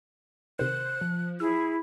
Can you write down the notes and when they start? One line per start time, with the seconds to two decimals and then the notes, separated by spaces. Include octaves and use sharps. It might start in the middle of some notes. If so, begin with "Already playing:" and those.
0.59 C3 D#3 C5 F#6
1.01 F3
1.40 E4 G#4 E6